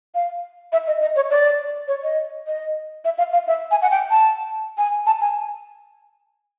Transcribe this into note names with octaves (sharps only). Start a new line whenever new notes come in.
F5
E5
D#5
D#5
C#5
D5
C#5
D#5
D#5
E5
F5
F5
E5
G#5
F#5
G5
A5
G#5
A5
G#5